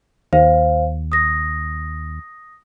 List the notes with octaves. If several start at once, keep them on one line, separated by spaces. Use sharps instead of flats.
D#2 C5 F5
D#6 A#6